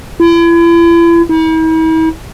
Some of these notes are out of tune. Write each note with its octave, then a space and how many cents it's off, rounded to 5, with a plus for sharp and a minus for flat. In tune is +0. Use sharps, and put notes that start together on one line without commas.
E4 +40
E4 -45